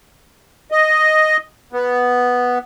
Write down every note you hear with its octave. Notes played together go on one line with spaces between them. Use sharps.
D#5
B3